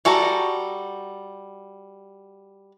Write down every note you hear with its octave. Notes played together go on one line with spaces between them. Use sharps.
G3 F#4 A4 A5 A#5